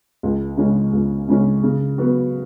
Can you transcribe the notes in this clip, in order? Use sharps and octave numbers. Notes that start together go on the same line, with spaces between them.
C#2
C#3 G#3 C#4
C#2
C#3 G#3 C#4
C#3
F#3 B3 F#4